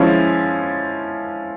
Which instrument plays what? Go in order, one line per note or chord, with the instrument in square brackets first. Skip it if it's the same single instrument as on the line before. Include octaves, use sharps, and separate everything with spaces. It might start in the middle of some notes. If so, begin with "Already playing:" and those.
Already playing: [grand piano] F3 G#3 C#4 E4